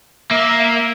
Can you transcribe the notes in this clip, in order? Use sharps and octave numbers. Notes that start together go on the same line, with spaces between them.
A#3 E5